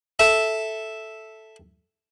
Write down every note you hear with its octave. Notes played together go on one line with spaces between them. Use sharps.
A4 E5